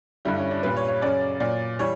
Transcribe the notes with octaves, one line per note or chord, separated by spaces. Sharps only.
G2 D3 G3 E4
C#4
D4
A#2 G3 B4
C#5
C#5
F#2 C#3 F#3 D5
A#2 F#3 D5
E3 G3 C#5